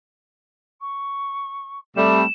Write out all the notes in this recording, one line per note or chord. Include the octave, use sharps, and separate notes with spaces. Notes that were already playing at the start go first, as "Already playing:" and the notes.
C#6
C3 G3 A3 E7